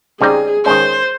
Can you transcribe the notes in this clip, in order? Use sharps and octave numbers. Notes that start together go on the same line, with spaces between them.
C#3 G3 C4 D#4 G4 G#4
D#3 G#3 C#4 C5